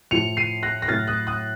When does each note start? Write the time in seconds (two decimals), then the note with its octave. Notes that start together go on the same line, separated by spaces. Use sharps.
0.11 A2 F3 C#7 F7
0.37 C7 D#7
0.63 F#6 A#6
0.82 A#6
0.88 A2 F#3 F6 A6
1.07 D#6 F#6
1.27 D#6 F#6